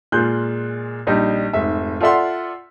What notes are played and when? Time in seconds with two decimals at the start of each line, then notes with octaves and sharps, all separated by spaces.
0.12 A#2 G#3 F4 G#4 F#6 G6
1.07 A#1 G3 D#4
1.53 F1 G#2 E5
2.01 F4 A4 D5 E5 F#5 C6